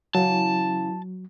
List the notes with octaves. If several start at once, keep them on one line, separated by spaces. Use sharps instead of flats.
C#3 E3 F#3 A5